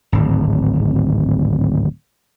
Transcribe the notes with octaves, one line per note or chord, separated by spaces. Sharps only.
D1 G#1